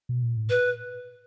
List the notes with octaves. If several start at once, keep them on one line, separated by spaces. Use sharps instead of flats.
B2
A#2
A2
B4